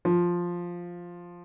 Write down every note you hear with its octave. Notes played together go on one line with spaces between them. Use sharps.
F3